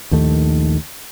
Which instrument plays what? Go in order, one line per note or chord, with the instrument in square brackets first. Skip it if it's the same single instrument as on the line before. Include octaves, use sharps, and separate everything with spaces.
[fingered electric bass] A#1 D#2 D#3 A3